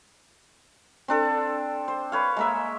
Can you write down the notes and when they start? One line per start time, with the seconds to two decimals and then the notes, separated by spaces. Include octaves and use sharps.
1.08 C4 D4 A4
1.88 C5
2.12 B4 C#5 F5
2.37 G#3 A#3 E5